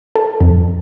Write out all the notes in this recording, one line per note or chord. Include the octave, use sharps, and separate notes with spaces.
A4
F2